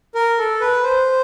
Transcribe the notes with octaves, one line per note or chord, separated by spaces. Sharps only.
A#4
A4
B4
C5